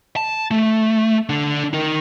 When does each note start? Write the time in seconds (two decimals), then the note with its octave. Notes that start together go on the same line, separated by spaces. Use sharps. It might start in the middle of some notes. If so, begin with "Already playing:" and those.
0.16 A5
0.51 A3
1.29 D3 D4
1.73 D#4 A#4